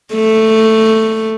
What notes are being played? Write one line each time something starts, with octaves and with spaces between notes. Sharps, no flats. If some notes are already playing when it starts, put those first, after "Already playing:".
A3